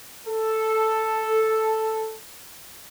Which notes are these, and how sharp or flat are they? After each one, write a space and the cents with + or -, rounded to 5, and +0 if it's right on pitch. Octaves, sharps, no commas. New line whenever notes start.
A4 +0